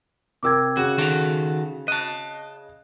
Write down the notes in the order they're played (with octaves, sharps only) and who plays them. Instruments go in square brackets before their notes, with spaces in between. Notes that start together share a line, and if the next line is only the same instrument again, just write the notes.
[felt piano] C3 A#4 G5 [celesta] D6 E6 G#6
[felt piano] C#3 [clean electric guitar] F#4
[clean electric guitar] D#3 F#4 A4 [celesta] E7 F7
[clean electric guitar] D#5 A5 [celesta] F#6